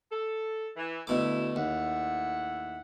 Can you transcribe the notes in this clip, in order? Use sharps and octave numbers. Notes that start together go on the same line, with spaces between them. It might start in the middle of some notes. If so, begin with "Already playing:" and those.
A4
E3
D2 B2 A3 E4 D6
D#2 A2 E5 F#5